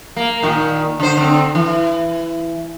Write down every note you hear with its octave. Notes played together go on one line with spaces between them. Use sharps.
A#3
A#2 D#3
D3 C5
D3 C4
E3